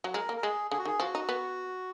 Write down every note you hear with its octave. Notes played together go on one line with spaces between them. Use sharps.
F#3
G#3 A#4
A#3
A#4
G#3 G#4
D3 G#4
F#4
D#3 G#4
F3 F#4
D#4
B3